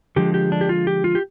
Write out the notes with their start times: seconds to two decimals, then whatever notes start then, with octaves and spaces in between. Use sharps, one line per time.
0.16 D3 F3 G#3 G4
0.34 G4
0.52 D4
0.61 G4
0.69 F4
0.87 G4
1.04 F4
1.15 G4